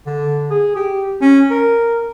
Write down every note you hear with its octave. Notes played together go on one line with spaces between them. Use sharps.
D3
G#4
G4
C#4
A#4